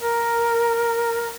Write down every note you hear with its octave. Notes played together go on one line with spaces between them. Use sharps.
A#4